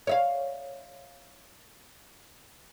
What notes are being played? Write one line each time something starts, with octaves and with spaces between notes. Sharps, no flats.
C#5 E5 F5